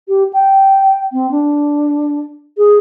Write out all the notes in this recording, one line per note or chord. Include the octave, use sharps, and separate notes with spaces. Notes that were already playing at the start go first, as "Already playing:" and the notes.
G4
G5
C4
D4
G#4